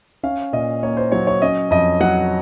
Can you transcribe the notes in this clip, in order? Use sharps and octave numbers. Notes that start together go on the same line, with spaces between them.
C#4 F5
A#2 D#5
A#3 C#5
C5
F#3 C#5
C#5
C#4 D#5
F2 D#5
F#3 F#5